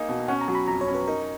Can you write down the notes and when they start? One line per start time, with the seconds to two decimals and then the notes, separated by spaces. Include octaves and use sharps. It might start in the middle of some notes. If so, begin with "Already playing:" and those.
Already playing: A#3 D#4 G#4 F5
0.09 B2
0.28 C#4 F#5
0.41 A#5
0.48 F#3
0.55 B5
0.68 F2 A#5
0.81 C#5
0.87 C#4
0.94 B4
1.07 D#4 A#4